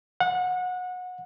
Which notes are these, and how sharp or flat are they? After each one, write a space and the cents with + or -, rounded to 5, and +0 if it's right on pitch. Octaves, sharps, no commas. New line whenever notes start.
F#5 -25